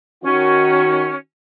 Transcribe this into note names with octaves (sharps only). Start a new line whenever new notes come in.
D#3 C#4 F#4